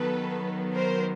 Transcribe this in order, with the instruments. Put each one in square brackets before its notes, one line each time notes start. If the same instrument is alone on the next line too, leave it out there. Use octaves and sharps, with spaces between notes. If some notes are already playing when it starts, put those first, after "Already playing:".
Already playing: [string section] D#3 F#3 B3 [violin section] A4 B4
[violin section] A#4 C5